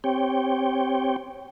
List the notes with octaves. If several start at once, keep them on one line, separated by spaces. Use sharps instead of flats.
C4 G4 C#5 G5